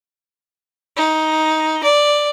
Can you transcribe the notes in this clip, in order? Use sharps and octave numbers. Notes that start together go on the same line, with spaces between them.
D#4
D5